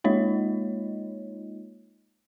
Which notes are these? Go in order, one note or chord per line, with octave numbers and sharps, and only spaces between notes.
G#3 A#3 D#4 F4 C#5 D#5